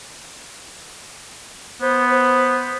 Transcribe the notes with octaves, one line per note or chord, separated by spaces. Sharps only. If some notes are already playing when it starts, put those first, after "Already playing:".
B3 C5
C5